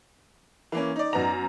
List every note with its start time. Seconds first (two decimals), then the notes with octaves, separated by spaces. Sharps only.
0.72 E3 A#3 C#4
0.96 D#4 D5
1.13 F#2 B3 A#5